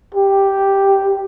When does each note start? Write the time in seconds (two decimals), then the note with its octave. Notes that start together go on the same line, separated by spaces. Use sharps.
0.15 G4